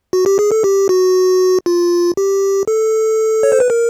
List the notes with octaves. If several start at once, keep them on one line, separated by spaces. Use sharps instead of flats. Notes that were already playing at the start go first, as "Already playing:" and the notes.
F#4
G4
G#4
A4
G4
F#4
F4
G4
A4
C#5
C5
B4
A#4